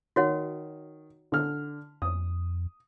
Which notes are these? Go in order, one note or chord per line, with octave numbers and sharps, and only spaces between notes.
D#3 F#4 C#5 F#5
D3 F6
F2 D#6